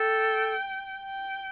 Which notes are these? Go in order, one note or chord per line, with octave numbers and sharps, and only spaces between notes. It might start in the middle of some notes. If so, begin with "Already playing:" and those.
Already playing: A4 G5
G5